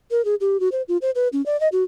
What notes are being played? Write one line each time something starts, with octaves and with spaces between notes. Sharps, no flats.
A#4
G#4
G4
F#4
C5
F4
C5
B4
C#4
D5
D#5
F#4